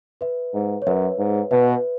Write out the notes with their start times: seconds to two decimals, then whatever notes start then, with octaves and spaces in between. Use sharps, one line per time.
0.21 B4 E5
0.54 G#2
0.82 C#5
0.86 F#2 B4 E5
1.18 G#2
1.51 B2 B4 E5